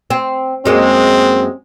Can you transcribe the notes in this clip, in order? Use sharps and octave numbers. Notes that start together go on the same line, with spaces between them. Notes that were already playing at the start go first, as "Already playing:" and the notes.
C4
F#2 G#3 A#3 C4